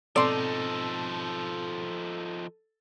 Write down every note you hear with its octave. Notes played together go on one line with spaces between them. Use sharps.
G#2 B2 F3 C4 D#4 A4 D5 C6